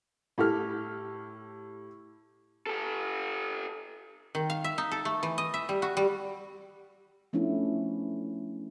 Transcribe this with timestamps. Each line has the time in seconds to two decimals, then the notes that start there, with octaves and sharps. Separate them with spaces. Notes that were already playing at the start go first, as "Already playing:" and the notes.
0.38 A2 G4 A4 F6
2.67 G4 A4
4.35 D#3
4.50 F5
4.64 E5
4.78 D#4
4.91 A4
5.05 A3
5.23 E3
5.38 D#5
5.54 E5
5.69 G3
5.82 F#4
5.97 G3
7.33 F3 A3 B3 C#4 D4 E4